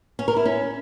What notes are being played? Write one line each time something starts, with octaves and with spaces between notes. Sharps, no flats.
C#4
A#4
E4
C#4